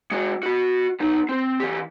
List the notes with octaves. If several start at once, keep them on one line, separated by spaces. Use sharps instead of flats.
G#3 F#4
F#4 B5
B3 D#4
C4
E3 G4